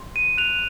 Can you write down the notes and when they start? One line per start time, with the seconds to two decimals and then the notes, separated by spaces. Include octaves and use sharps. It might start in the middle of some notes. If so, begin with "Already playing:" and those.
Already playing: C6
0.16 D#7
0.38 F#6 F7